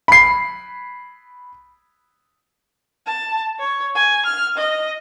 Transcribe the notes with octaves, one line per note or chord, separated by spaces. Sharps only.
B5 C7
A5
C#5
G#5
F6
D#5